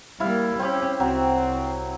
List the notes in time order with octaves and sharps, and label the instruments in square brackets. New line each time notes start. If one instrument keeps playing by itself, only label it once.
[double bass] G3 A#3 [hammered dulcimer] E4 F5
[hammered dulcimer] C4 G4 [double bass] C#4
[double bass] C2 [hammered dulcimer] F#3 [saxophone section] C4